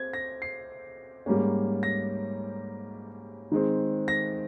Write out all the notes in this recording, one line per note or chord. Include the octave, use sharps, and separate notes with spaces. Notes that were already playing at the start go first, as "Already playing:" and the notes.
Already playing: C4 G#6
A#6
C7
G#2 G3 A#3 C#4
A#6
D#3 G#3 C4
A#6